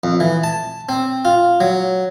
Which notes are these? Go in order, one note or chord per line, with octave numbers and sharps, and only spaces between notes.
F2
E3
A5
C4
F4
F#3